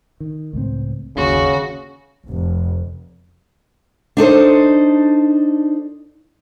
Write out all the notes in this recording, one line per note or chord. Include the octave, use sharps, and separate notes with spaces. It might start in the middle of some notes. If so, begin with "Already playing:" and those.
D#3
C#2 A2 C4
G1 D#2 C#3 F#4
F1
D4 D#4 A4 C5